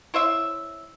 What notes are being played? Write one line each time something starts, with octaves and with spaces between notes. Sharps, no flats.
E4 C5 C#5 E5